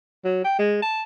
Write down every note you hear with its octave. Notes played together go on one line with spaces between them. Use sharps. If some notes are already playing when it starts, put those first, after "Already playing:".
F#3
G5
G#3
A5